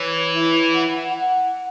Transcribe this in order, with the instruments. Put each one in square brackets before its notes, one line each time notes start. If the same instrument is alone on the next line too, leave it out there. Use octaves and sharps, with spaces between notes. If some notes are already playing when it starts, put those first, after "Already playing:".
Already playing: [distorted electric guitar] E3 [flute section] C#5
[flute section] E4
F#5
F#5